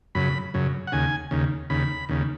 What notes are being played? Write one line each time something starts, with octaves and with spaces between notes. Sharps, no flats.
F#2 C#3 B5
F#2 C#3
F#5
D#2 C#3 G#5
D#2 C#3
D#2 C#3 B5
D#2 C#3